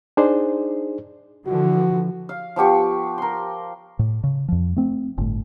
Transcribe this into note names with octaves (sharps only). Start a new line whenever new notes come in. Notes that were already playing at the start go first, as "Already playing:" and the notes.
D4 D#4 G#4 C5 D5
D3 E3 F3 F#4
F5
F3 B3 G4 C#6
A#4 C6
A2
C#3
F2 F3
A3 C4
G1 A2